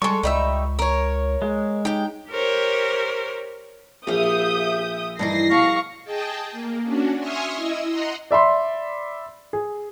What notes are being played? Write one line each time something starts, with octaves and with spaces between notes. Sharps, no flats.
G3 G#3 A4 C#6
C#2 G3 D#4 E5
A#4 C#5
G#3
D#4 G4 G5
G4 A#4 C5 C#5
A#1 G4 E5 F5 D#6 G6
G2 E3 D#4 A#6 C7
B2 F5 C#6
G#4 D#5 G5 A5
A#3
C#4 D4 F#4
E5 G#5 C6 C#6 D#6 F6
E4 D#5 E6
D#5 F#5 A#5 C6
D5 E5 B5 C6
G#4